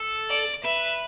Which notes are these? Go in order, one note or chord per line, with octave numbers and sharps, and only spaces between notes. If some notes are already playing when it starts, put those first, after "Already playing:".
Already playing: A4
D5
B4 E5